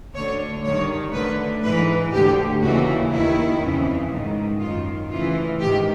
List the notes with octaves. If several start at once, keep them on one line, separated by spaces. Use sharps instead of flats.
D2 D3 C#5
G2 D#3 C#5
D2 D3 B4
G#2 E3 B4
D2 D3 G4
D#2 C#3 E3 F#4
D#2 D#3 E4
F2 C#3 E3
G#2 D#3
F#2 D#3 F4
D2 C#3 E3 F4
G#2 D#3 G4